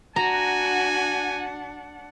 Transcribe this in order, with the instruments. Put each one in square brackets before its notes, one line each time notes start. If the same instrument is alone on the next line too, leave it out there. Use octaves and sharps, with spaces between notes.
[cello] D4 F#5 [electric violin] F#4 [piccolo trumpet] G#5 [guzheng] A#5